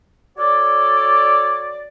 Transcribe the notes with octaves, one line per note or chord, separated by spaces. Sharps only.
F#4 A4 C#5 D5